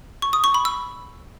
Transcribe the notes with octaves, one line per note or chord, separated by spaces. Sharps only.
C#6
D#6
C#6
B5
E6